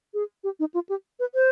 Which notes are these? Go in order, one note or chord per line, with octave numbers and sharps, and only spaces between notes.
G#4
G4
D#4
F4
G4
B4
C5